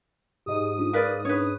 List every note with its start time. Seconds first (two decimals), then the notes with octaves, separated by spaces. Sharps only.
0.46 G#2 G4 D#5 D#6
0.78 C#4 D4 F4
0.93 A#4 B4 D5 F5
1.25 C#4 D4 B4 C#5